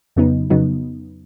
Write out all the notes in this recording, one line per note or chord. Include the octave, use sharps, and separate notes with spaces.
F2 C#3 F#3 B3 D#4
F2 C#3 F#3 B3 D#4